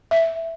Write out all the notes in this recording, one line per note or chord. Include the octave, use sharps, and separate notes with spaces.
E5